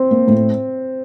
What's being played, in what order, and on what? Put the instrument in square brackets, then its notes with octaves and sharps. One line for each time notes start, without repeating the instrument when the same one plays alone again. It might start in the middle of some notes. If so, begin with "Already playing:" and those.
Already playing: [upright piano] C4
[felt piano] A#3
A2